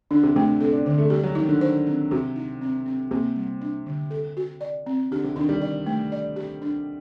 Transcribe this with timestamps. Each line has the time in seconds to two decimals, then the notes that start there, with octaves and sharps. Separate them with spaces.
0.11 D3 D4
0.23 C3
0.36 C3 A3
0.48 D3
0.60 C4 A4
0.73 D4
0.86 D3 C4
0.98 A3
1.10 G3 G4
1.24 F#3
1.35 D#3 D#4
1.48 D3
1.61 C5
1.86 C4
2.11 C3 F#4
2.36 D#4
2.61 C4
2.86 C4
3.11 C3 A#3
3.35 G3
3.61 D4
3.86 D3
4.11 A4
4.37 F#4
4.61 D5
4.86 C4
5.11 D3 G4
5.24 C3
5.36 D#3 D4
5.49 G3
5.61 D5
5.86 A3
6.12 D5
6.36 G4
6.62 D4